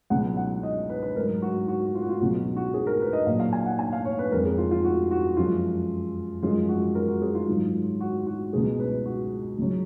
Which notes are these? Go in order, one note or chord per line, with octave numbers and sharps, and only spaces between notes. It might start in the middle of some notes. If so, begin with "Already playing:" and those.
C#2 B2 F#3 F#5
F#5
D#5
B4
B4
G#2 F#3 A#4
F#4
F#4
F4
F#4
F4
C#2 B2 F#3 F#4
F#4
F#4
G#4
A#4
B4
D#5
A#2 F#3 F5
F5
G#5
F#5
G#5
F5
C#5
B4
F2 F3 G#3 A#4
G#4
F4
F4
F#4
F#4
F#2 F3 G#3 F4
F#2 F3 G#3 F4
F#4
A#4
F#4
G#4
F4
G#2 D#3 F#3
F#4
F#4
C#2 B2 G#3 G#4
B4
F#4
C#2 C#3 F#3